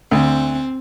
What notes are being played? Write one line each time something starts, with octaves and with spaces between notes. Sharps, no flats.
D2 C4